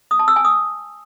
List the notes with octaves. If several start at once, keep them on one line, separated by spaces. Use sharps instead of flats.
D#6
A5
E6
G#5
D#6